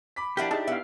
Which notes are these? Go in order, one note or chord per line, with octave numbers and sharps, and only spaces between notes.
B5 D6 B6
F3 D4 E4 F#4 G4 A#4
D#4 G#4 A5
B3 E5 F5